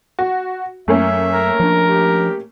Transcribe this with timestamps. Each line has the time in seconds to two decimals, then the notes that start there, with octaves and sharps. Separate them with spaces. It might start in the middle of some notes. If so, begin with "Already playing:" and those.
0.19 F#4
0.88 F#2 A3 A#3 C#4 E5
1.30 A#4
1.60 F3 D4
1.85 G4